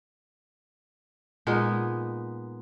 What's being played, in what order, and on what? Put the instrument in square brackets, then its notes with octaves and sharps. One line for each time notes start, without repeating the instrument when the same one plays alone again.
[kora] A#2 G#3 B3 D#4